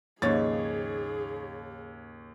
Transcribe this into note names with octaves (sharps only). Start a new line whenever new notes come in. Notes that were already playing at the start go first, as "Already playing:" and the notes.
D#2 G#2 C#3 F3 G#4 C#5 A6